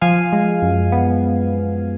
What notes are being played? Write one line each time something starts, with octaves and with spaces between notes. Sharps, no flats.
F3 F5 G#5
G#3
F#2
B3